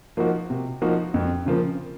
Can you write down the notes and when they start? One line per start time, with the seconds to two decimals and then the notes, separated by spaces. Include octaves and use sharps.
0.17 F3 A#3 D#4 F#4
0.50 C3
0.82 F3 A#3 D#4 F#4
1.14 F2
1.46 C#3 F3 A#3